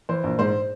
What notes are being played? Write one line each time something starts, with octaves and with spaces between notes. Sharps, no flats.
E3 C5
A#1
G#2 C5